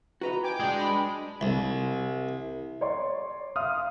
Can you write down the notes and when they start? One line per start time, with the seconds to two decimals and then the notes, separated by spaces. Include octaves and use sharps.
0.21 F#4 B4 D#5 A#5
0.42 G5 G#5 D6
0.60 G#3 D4
0.78 B5
1.41 C2
2.81 C#5 D5 C6 C#6
3.56 E5 F5 C6 D#6 F6